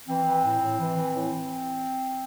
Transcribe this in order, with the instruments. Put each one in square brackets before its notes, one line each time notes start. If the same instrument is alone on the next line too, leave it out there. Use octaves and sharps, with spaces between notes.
[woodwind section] E3 C4
E3
A2
A2
E3
E3
A2